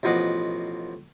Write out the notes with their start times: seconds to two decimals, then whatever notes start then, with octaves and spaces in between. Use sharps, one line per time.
0.03 A1 B2 F3 D#5 F#5 D6